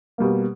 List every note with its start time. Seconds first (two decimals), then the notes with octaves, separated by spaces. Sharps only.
0.18 B2 G3 A#3